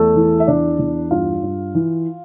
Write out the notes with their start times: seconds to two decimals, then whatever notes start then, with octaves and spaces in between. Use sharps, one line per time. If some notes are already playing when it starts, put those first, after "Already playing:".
Already playing: E2 A3 A4
0.16 E3
0.40 E5
0.47 E2 D4 D5
0.79 E2
1.11 G2 F4 F5
1.43 G2
1.75 E3